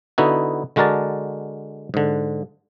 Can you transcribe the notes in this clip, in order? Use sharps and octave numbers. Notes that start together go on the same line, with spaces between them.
D3 B3 D#4 E4 F#4
D3 G#3 F#4 A#4 D5 A5
G#2 D3